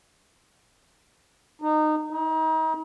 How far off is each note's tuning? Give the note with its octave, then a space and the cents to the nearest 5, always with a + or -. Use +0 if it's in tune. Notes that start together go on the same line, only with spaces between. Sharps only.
D#4 -20
D#4 +35